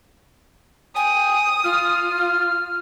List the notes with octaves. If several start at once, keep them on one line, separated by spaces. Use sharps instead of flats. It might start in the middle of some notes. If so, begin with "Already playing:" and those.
G5 G#5 D#6
F4 F6